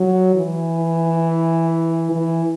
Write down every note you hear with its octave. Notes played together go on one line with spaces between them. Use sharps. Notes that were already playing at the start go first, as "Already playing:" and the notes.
Already playing: F#3
E3
E3